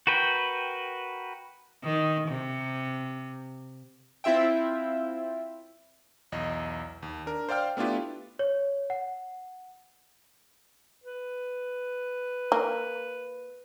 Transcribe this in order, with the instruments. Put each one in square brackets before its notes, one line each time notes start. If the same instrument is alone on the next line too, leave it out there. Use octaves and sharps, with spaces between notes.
[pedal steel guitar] F#4 A#4 B4 G5
[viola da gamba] D#3
C3
[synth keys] C4 E4 F4 E5 G5
[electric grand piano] B1 E2 D#5
D#2
D4 A#4
C5 D5 F5 G5 F6
A3 B3 D4 E4 F4 G4
[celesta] C#5
F#5
[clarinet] B4
[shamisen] A#3